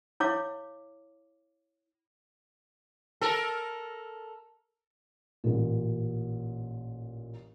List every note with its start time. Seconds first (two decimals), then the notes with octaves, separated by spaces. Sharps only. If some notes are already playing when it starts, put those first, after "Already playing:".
0.20 E4 C#5 F5 D6
3.21 A4 A#4
5.44 A1 A#2